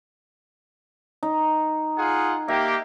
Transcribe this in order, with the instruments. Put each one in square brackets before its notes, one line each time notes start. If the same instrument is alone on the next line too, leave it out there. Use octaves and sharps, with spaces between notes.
[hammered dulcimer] D#4
[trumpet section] F4 G#4 F#5
[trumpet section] A#3 G4 [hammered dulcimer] E5